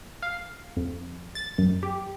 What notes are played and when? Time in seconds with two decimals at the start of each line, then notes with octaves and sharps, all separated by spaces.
0.23 F5
0.77 F2
1.35 A6
1.58 F#2
1.83 G4